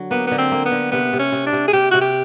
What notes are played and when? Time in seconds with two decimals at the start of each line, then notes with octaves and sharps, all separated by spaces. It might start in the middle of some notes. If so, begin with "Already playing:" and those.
Already playing: D3 F#3
0.11 A#3 B3
0.27 D3 B3
0.38 C4
0.52 A#3
0.66 B3
0.71 D3
0.92 C3 B3
1.13 C3
1.19 C#4
1.32 C3
1.47 D4
1.53 C3
1.68 G#4
1.73 C3 G4
1.91 C3 F#4
2.01 G4